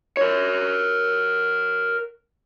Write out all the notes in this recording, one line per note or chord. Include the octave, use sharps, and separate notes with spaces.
A#4 C#5